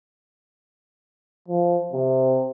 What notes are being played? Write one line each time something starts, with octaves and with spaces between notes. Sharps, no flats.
F3
C3